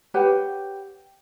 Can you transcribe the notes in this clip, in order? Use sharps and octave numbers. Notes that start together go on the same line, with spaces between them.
G4 B4 C#5 F#5